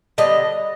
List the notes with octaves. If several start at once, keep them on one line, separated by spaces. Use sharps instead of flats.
D3 G3 B3 D#5